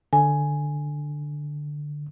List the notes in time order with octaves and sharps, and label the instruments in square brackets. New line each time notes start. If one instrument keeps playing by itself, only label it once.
[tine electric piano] D3 [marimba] G#5